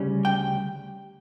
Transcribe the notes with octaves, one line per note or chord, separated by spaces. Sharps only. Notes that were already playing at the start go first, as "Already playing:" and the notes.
Already playing: D2 C#3 G3 C#4
G5